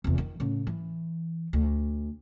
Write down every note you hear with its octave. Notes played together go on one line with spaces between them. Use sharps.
F1 E2
D#3
A2 C#3
E3
D2